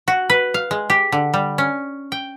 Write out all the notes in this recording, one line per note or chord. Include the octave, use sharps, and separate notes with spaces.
F#4
B4
F5
G#3
G4
D3
G3
C#4
G5